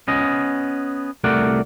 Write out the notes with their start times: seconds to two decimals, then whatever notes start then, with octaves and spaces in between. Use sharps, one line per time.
0.08 B3 C#4 D#5
1.24 C2 A3 A#4 D5 F#5